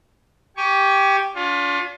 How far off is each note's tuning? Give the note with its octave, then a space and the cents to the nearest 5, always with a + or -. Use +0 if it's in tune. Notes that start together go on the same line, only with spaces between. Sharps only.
G4 +0 G#5 +20 C#6 +20
D4 -40 F4 +25